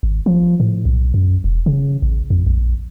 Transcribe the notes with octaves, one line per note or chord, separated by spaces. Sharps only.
G#1
F3
A2
B1
F#2
E1
C#3
A1
F2
A#1